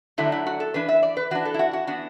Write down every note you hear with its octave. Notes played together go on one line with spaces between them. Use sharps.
D3 F#3 A3 D4 E4
E4
F#4
A4
E3 D4 B4
E5
D5
B4
E3 D4 F#4
A4
E4
F#4
F#4
E3 B3 D4 F#4